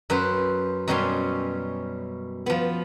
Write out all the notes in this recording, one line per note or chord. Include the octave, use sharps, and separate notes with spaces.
F#2 B4 C5
F#2 B2 G3 C#4 G#5 C6
F3 B3